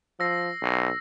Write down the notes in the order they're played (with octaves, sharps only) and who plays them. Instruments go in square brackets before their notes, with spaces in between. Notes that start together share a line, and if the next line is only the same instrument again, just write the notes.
[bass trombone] F3 [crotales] E6 A#6 C7
[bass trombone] B1